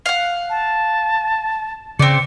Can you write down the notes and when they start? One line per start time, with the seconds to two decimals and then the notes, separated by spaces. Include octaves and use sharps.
0.06 F5 F#5
0.50 A5
1.99 C#3 C4 D5 C#7